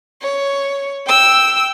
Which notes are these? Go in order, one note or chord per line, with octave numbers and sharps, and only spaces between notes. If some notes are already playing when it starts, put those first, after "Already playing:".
C#5
G5 E6